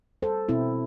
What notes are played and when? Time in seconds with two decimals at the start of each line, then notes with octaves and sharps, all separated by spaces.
0.22 G3 A4 C5
0.49 B2 C4 E4